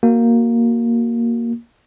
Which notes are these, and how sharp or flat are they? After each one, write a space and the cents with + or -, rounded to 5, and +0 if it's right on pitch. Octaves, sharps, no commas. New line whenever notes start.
A#3 +0 F#4 +10